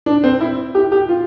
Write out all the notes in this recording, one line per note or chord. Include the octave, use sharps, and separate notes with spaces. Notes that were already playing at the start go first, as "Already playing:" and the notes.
D4
C4
E4
G4
G4
F4